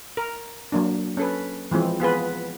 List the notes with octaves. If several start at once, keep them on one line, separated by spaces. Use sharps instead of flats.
A#4
F#3 A#3 D4
C#4 A4 B4
E3 F3 G#3 C4
B3 F4 G#4 B4